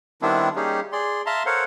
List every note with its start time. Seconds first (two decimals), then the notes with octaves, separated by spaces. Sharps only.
0.22 D#3 G3 B3 C4 D4 E4
0.56 G3 A#3 C#4 D#4 G4 G#4
0.92 G#4 D5 C6
1.26 E5 F5 A5 A#5 C6
1.46 A4 A#4 C5 C#5 F5 F#5